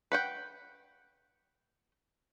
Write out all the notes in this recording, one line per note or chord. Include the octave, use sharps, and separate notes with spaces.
B4 F#5 G5